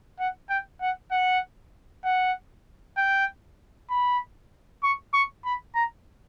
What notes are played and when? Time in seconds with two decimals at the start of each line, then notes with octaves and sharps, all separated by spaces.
0.20 F#5
0.50 G5
0.81 F#5
1.11 F#5
2.04 F#5
2.97 G5
3.90 B5
4.83 C#6
5.14 C#6
5.45 B5
5.75 A#5